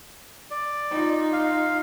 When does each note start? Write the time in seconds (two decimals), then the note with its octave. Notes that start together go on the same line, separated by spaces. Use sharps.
0.51 D5
0.91 D#4 F4
1.33 F5